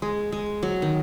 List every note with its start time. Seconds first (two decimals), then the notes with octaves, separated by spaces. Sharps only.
0.02 G#3
0.32 G#3
0.63 F#3
0.82 D#3